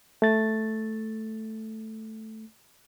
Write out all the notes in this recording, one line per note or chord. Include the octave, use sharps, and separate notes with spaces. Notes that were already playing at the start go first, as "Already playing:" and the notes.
A3 A6